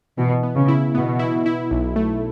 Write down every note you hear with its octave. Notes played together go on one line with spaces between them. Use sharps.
B2 E3
B3
C#3
E4
B2 B3
E4
E4
B1
A3